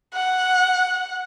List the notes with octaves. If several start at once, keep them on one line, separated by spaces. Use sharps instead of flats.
F#5